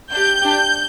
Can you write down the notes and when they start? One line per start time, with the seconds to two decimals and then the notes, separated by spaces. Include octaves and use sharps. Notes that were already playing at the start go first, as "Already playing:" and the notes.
0.11 D4 G4 G6
0.41 D4 G4